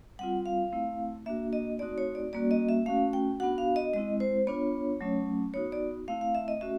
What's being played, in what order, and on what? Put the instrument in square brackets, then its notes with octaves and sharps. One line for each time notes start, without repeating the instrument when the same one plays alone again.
[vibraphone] G3 C4 F4 F#5
F5
A3 C4 E4
A#3 D4 F#4 E5
D#5
A3 C4 D#4 F#4 D5
C#5
D5
G3 A#3 C#4 F#4 D5
D#5
E5
A3 C#4 F#4 F5
G5
B3 D4 F#4 F#5
F5
D#5
G#3 C4 E4 D#5
C5
B3 D4 F4 C#5
F#3 A3 C#4
B3 D#4 F#4 C#5
D5
A3 C4 E4 F5
F5
E5
D#5
A3 C#4 F#4 E5